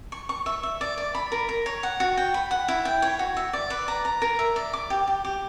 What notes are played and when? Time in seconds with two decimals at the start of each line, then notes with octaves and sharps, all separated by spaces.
0.12 C#6
0.29 C#6
0.46 E5
0.63 E5
0.81 D5
0.98 D5
1.15 B5
1.32 A#4
1.49 A#4
1.66 C#5
1.83 F#5
2.00 F#4
2.17 G5
2.34 B5
2.51 F#5
2.68 E4
2.85 G5
3.02 C#5
3.19 F#4
3.37 E5
3.53 D5
3.70 B4
3.88 A#5
4.05 A#5
4.22 A#4
4.39 E5
4.56 D5
4.73 D6
4.90 G4
5.07 G4
5.25 G4